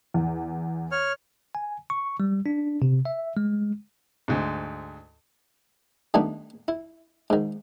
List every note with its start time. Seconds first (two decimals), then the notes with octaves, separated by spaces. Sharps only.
0.14 E2
0.92 C#5 F6
1.55 G#5
1.90 C#6
2.20 G3
2.46 D4
2.82 C3
3.05 E5
3.37 G#3
4.28 D2 G#2
6.14 D#3 G3 A3 B3 D4 D#4
6.68 E4
7.30 G#2 D#3